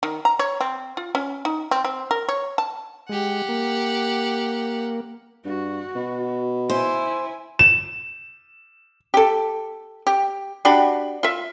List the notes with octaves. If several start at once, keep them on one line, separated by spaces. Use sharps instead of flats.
D#3
A#5
C#5
C4
F4
C#4
D#4
C4
C4
A#4
C#5
A5
G#3 G4 F#5
A#3
G2 F#4
B2
E4 C5 G#5
E7
G4 A4
G4
D4 F#4 G4 B5
F4 E5